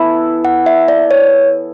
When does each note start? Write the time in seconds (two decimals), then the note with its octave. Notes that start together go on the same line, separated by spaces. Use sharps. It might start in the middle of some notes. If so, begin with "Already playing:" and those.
Already playing: E3 B3 E4 A4
0.45 F#5
0.66 E5
0.88 D5
1.11 C#5